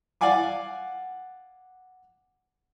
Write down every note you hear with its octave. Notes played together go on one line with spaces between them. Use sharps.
D5 F5 F#5 G#5 D6